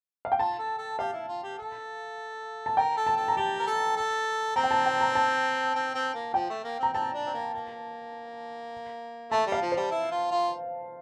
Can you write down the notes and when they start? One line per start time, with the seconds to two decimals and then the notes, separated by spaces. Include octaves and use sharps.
0.25 F5
0.32 G5
0.39 F4 A5
0.59 A4
0.78 A4
0.99 G4 F5
1.13 E4
1.29 F4
1.43 G4
1.58 A4
2.66 A5
2.77 A#4 G5
2.97 A4
3.06 A5
3.17 A4
3.28 A#5
3.37 G4 A5
3.59 A#4
3.67 A4
3.96 A4
4.56 C4 A#5
4.63 G5
4.71 A5
4.86 G5
5.01 A#5
5.15 A5
5.75 C4
5.95 C4
6.14 A#3
6.34 F3 G5
6.50 A3
6.64 A#3
6.79 C4 A#5
6.93 C4 A5
7.14 D4
7.26 C4
7.34 A#3
7.53 A#3
9.32 A3 A5
9.47 G3
9.52 F5
9.62 F3
9.72 G3 C5
9.91 E4
10.12 F4
10.31 F4